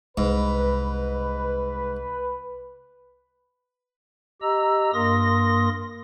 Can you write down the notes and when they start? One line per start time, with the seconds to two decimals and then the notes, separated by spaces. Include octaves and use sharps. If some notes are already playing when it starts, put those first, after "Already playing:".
0.17 C2 G#2 B4
4.42 G4 D#5 A#5 E6
4.94 G2 A#3 A#4 C6 D#6 A#6